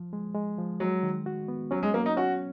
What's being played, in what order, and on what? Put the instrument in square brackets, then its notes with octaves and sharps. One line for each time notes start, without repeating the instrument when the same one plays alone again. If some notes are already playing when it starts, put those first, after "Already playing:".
Already playing: [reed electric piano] F3
G#3
G#3
F3
[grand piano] F#3 [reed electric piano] G#3
[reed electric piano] D#3
F#4
B3
[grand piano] F#3 [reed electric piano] C#4
[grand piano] G#3
[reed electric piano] F#3 [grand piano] A#3
[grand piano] D#4
[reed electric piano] C#4 [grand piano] F#4